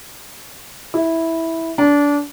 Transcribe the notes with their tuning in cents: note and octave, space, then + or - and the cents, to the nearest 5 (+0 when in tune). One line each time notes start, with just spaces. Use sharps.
E4 -10
D4 -25